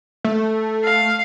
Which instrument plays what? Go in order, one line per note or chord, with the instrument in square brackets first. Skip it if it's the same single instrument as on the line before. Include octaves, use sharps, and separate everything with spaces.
[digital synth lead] A3
[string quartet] F5